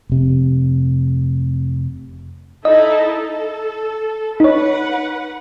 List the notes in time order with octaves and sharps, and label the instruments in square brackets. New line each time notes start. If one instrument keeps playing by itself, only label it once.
[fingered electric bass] F1 C3
[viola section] D#4 E4 A4 [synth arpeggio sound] D#5
[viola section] A4
[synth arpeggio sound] D#4 C#5 [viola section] B4 F#5